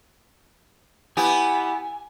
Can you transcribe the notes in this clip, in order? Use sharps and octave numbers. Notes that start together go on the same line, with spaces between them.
B3 E4 G4 G#5